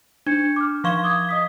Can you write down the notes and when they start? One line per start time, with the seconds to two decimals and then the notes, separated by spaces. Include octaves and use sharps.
0.27 D4 G#6 C#7
0.56 D6 F6
0.84 F3 F5 C6 C#6 G#6 G7
1.04 D6 D#6 G#6
1.29 D#5 D#6 B6